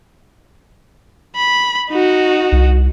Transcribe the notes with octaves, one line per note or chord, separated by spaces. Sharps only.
B5
D#4 F#4
C2